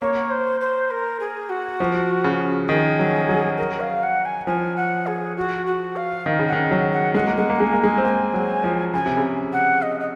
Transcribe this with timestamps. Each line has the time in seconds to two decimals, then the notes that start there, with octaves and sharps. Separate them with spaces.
0.01 A#3 C#5
0.31 C5
0.61 C5
0.91 A#4
1.20 G#4
1.49 F#4
1.80 F3
2.24 C#3
2.69 D#3 G#4
2.99 F#3
3.29 F#3
3.58 A#4
3.80 F5
4.03 F#5
4.25 G#5
4.47 F3 G#5
4.76 F#5
5.07 G#4
5.37 F#4
5.66 F#4
5.96 F5
6.26 D#3
6.39 C#3
6.48 D#3 F#5
6.71 F#3
6.92 F#5
7.14 G#3 F#5
7.27 A#3
7.37 G#3 F#5
7.50 A#3
7.59 G#3 G#5
7.73 A#3
7.82 G#3 G#5
7.98 C4
8.04 A#3 G#5
8.34 F#3
8.64 F3
8.94 C#3 G#5
9.06 C3
9.17 C#3
9.53 F#5
9.82 D#5
10.00 D#5